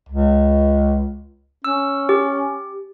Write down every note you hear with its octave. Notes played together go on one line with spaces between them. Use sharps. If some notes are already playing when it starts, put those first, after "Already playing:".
C#2
C#4 E6
G4